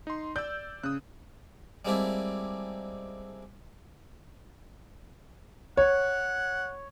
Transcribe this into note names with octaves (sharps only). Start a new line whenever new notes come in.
D#4 C6
D5 E6 G6
C#3 D#6 F#6
G3 G#3 A#3 C4 D4 E4
C#5 F#5